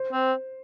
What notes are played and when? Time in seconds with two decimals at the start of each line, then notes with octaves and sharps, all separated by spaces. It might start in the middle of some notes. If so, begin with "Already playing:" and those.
Already playing: C5
0.12 C4